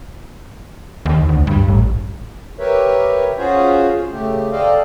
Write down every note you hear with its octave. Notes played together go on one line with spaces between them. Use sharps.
D#2
D2
G2
A1
G4 A#4 B4 C#5 E5
C#4 F4 F#4 G#4 C5 C#5
C#3 A3 G4
A4 C5 D5 D#5 F5 G5